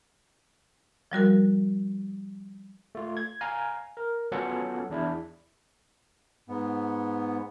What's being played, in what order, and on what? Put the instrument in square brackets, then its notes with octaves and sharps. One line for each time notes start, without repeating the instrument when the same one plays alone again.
[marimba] F3 G3 F#4 A#4
[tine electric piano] A3 F4
G#6
F5 G#5 A#5
A#4
F#3 B3 C#4 F4 A4 F#5
E2 D4 E4
[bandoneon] G#2 B3